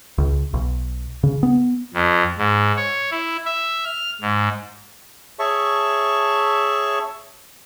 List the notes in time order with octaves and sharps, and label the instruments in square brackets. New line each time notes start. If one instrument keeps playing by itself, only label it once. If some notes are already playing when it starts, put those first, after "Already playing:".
[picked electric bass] C#2
B1
C#3
B3
[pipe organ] F2
G#2
C#5
E4
E5
F6
G#2
[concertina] G#4 C#5 E5 A5 C#6